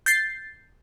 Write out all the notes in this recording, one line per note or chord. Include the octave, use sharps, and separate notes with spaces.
G6 A6 C7